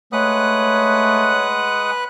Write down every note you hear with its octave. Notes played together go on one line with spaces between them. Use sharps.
G#3 A3 B4 C#5 F#5 D#6 F#6